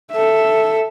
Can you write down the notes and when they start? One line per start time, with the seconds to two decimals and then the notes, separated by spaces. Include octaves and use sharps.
0.11 A4 E5